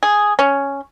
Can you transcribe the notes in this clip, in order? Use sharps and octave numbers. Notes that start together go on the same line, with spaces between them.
G#4
C#4